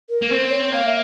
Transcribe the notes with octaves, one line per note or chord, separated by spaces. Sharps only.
A#4
A#3
C4 C5
C#5
A#3 F5
E5